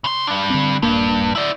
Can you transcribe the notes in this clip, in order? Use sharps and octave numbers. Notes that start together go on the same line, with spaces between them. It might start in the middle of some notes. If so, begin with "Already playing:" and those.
C#3 C6
G3 D4
D3 C4
D#1 G2 A#3 D4
E4 D5